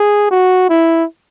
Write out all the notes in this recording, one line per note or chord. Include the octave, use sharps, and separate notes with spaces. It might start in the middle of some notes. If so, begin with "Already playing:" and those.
Already playing: G#4
F#4
E4